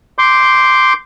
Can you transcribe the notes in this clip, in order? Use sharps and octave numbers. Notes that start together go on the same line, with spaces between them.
C6 D6 G6